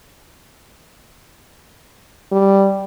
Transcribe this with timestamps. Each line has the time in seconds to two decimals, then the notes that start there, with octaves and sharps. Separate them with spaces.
2.32 G3